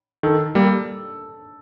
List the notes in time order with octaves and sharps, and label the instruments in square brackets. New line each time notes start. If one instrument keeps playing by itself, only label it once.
[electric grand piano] D#3 [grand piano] A4
[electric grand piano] G3 A#3